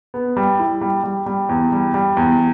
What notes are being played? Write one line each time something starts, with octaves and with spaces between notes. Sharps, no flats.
B3
G3
E4
G3
G3
G3
E2
G3
G3
E2